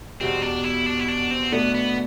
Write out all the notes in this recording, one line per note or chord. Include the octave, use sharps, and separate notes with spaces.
E2 B2 G3 C4
D4
E4
D4
E4
D4
C4
B2 A3 B3 D4
B3